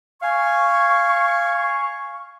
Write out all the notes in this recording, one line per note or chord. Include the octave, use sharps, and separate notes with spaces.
F5 G#5 C#6